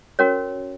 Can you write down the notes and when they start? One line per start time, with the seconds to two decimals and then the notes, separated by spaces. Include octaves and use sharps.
0.19 C#4 F#4 A#4 C#5